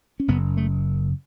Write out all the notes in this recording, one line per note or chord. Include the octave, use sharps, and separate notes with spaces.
C#4
F#1 F#2 C#3 B3
A3